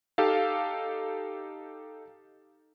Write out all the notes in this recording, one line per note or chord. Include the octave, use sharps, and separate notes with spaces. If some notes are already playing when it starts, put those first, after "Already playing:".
D#4 G4 A4 F5